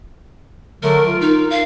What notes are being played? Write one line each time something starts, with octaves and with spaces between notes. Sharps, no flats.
D3 F#3 A3 A#4
F4
D#4
F5